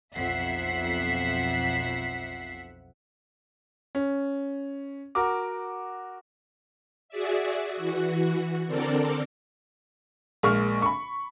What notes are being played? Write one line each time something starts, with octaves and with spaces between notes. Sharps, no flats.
B1 F2 E5 F#5 B6 C7
C#4
F#4 A#4 D6
F#4 G#4 D5 E5
E3 F#4
D3 C4 A4 A#4 D5
A#1 G#3 A#3 C#6 F6
B5 C#6